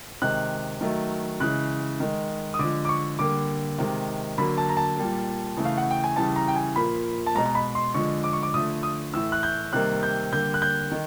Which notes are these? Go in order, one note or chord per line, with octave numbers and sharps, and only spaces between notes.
C3 D#3 G#3 F#6
D#3 F#3 A3
C#3 E3 G#3 F#6
D#3 G#3
D#6
D3 F3 G#3 D6
D6
C#6
D3 G3 A#3 D6
C3 D#3 G#3
D3 F#3 A#3 B5
A5
A#5
A5
A#2 G3 A#3
C#3 E3 A3
F5
F#5
G5
G#5
C#3 E3 G3 A5
A#5
G5
G#5
A#2 F3 A#3 B5
A5
B2 G#3 A#5
A#5
B5
C6
D3 F3 G#3 C#6
D6
C#6
D6
D3 F3 A3 D#6
D#6
A2 E3 A3 E6
F#6
G6
C3 D#3 G3 A#3 F#6
G6
D3 G3 A#3 G6
F#6
G6
D#3